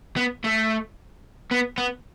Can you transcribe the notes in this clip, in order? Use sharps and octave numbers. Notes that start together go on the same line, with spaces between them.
B3
A3
B3
B3